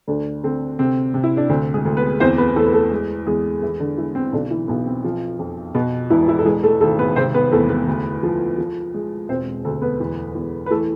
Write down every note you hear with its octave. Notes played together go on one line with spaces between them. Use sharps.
D2 D3 D4
D3 C4
C3 C4
C3
E4
D4
D2 C4
G#3 G#4
D2
B3 B4
E2 C4 C5
B3 B4
E2 A3 A4
B4
A3 A4
G#3
E2 G#3 G#4
E3 G#3 E4
D3 D4
E3 G#3 E4
C4
B1 D3 D4
E3 E4
B1 B3
C4
F3
F2
B2 B3
E1 E3 E4
E3 E4
A4
E3 G#3 G#4
A3 A4
G#1 A3 A4
B3 B4
C3 C4 C5
B3 B4
E2 A3 A4
B3 B4
D2
F3
F3
G#3
E1 C4 C5
D2 A3 A4
B3 B4
E2
E2
B4
E3 A3 A4